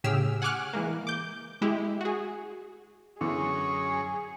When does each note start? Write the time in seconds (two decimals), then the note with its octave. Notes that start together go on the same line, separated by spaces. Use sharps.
0.04 A2 C#3 G4 G#4 E6 F6
0.42 F#5 G#5 C#6 D6 F6 F#6
0.73 E3 G#3 A#3
1.07 D6 G6
1.62 G#3 E4 G4
2.01 F#4 G#4
3.21 F#2 D3 E3 C#4 G#4 C#6